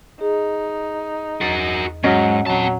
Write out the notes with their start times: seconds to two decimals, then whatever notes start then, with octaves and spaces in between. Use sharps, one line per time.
0.21 D#4 G#4
1.41 E2 F#4 A#4 A6
2.03 G#2 F#3 C#4 F#4 D#5 F6 A#6
2.46 A#2 F#3 C4 A5